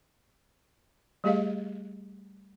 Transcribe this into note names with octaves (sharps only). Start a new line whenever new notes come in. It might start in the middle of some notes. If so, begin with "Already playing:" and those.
G3 A3 G4 G#4 D#5 F5